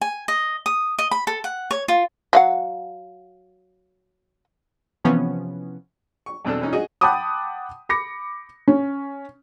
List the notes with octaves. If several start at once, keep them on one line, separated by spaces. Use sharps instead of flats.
G#5
D#5
D#6
D#5
B5
A4
F#5
C#5
F4
F#3 F5 F#5
C3 E3 F3 B3 C#4
C#6
E2 B2 C4 D4 A4
E3 C#4 D#4
F#4 G#4 D#5 D#6
F#5 G5 A5 B5 D6 D#6
B5 D6 A#6 C#7
C#4